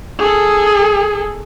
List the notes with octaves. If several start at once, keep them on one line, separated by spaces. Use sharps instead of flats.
G#4 A4